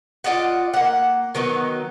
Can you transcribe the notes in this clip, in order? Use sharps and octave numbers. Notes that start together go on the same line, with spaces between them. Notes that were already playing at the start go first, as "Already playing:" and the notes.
F4 D5 D#5 F#5
A#3 F#5
D#3 F#3 B3 D#4